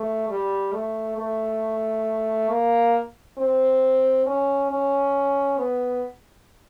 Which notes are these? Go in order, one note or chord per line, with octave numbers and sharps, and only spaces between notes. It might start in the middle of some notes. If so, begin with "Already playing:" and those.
Already playing: A3
G3
A3
A3
A#3
C4
C#4
C#4
B3